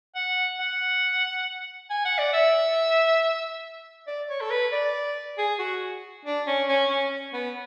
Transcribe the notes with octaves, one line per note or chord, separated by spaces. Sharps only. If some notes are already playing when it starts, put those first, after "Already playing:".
F#5
F#5
G#5
F#5
D5
E5
D5
C#5
A4
B4
D5
G#4
F#4
D4
C#4
C#4
C#4
B3